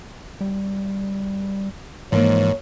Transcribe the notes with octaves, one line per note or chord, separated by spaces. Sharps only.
G3
G#2 E3 F3 A#3 C#5